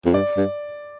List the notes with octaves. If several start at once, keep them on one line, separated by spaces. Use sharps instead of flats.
F2
G2 D5
G2